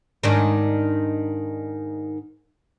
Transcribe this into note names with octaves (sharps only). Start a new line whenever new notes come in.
G#2 D#3 D4